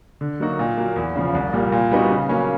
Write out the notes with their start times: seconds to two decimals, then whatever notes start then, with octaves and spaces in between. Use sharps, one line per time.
0.21 D3
0.40 F#3 A#3 D#4 F#4
0.59 A#2
0.78 F#3 A#3
0.96 E2
1.15 C#3 F3
1.35 C2
1.53 A#2 G3 A#3
1.72 A#2
1.91 G3 B3 D#4 F#4
2.10 C#3
2.29 F#3 A#3 C#4